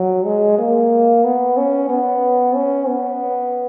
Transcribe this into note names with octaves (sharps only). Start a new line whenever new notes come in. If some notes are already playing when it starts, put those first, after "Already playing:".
Already playing: F#3
G#3
A#3
B3
C#4
B3
C#4
B3